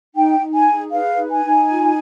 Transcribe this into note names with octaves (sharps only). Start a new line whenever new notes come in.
D#4 G5
D#4
G#5
G#4
B4 F5
D#4
G#5
D#4
F4